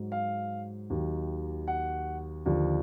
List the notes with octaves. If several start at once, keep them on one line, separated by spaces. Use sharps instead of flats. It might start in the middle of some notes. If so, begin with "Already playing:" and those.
Already playing: G#2 F#3
F5
D#2 D#3 F#3
F#5
D#2 D3 F3